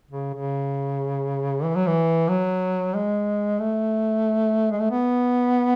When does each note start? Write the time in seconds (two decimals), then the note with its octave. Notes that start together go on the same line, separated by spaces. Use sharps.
0.11 C#3
0.33 C#3
1.64 E3
1.75 F#3
1.87 E3
2.29 F#3
2.95 G#3
3.59 A3
4.71 G#3
4.80 A3
4.91 B3